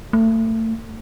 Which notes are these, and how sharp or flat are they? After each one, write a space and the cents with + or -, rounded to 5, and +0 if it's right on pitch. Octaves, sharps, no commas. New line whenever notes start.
A3 +30